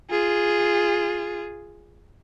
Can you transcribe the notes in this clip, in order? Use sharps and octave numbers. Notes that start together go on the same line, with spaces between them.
F4 G#4